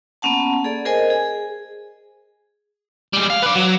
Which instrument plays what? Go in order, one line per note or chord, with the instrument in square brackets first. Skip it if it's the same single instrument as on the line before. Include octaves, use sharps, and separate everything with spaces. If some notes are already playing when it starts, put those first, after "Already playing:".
[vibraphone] A#3 B3 C#4 F#5 A5
G#4 A4 D5
G#4 A#4 C5 D#5 G#5
G#4
[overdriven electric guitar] G3 G#3
F5
B4 D5
F#3